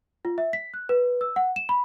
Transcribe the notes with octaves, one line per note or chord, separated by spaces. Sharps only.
F4
E5
B6
F#6
B4
E6
F#5
E7
B5